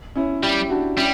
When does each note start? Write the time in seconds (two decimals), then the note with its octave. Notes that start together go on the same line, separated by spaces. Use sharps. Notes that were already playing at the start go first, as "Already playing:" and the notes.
0.15 C#4 E4
0.43 G3 E4 G4
0.70 D4 F#4
0.97 G3 C#4 E4